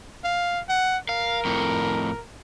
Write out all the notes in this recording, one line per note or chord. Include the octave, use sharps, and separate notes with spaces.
F5
F#5
A#4 F5
F2 A2